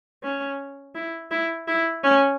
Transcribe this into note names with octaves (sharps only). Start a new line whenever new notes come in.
C#4
E4
E4
E4
C#4